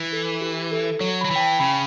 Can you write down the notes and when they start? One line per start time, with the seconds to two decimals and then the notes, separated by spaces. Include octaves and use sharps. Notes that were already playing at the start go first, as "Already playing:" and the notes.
Already playing: E3
0.13 A4
0.41 G4
0.72 A4
1.00 F#3 C#5
1.21 F#3 B5
1.31 E3 G5
1.40 A5
1.60 C#3 B5